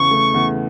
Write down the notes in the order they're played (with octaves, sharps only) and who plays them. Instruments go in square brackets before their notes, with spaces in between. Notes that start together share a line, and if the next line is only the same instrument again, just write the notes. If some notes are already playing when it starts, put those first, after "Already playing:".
Already playing: [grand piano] E2 C#3 [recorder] C#6
[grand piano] A3
E2